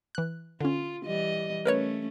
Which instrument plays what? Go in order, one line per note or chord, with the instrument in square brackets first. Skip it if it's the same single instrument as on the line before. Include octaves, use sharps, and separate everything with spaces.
[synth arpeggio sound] E3 F#6
[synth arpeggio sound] D3 C#4 [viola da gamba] F4
[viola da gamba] E3 G3 D#5
[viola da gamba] A3 C#4 [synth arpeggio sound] A#4 B4 C#5